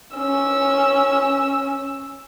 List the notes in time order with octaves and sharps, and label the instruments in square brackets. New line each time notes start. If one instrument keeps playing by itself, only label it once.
[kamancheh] C#4 E6